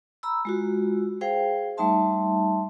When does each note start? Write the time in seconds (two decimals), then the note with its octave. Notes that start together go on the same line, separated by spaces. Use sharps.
0.23 A#5 B5 E6
0.45 G#3 F4 F#4
1.21 G#4 C5 F5 G5
1.77 G3 A3 D#4 E5 A5 C6